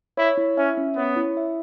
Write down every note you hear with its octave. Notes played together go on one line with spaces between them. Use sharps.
E4 C#5
E4
C#4 E5
C#4
B3 C#5
E4
E5